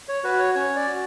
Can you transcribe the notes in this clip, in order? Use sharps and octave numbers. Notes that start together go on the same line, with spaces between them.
C#5
F#4 B4
C#5
C#4 C#5
D5
F#4